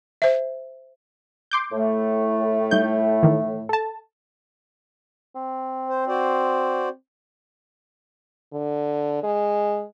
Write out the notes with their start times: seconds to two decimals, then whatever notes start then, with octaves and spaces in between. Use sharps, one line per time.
0.22 C5 E5
1.51 C6 D6 G6
1.72 A2 A3
2.71 G3 D#4 G6
3.23 D#3 E3
3.69 A4 A5
5.35 C4
5.89 C5
6.08 F#4 C5 D5
8.53 D3
9.23 G#3